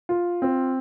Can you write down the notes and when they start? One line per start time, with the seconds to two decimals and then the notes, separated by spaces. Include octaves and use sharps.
0.09 F4
0.42 C4